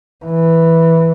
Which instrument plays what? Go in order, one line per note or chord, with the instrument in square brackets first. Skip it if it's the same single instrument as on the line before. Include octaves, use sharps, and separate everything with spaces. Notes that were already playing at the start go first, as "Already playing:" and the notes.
[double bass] E3